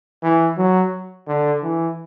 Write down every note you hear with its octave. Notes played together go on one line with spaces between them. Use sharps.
E3
F#3
D3
E3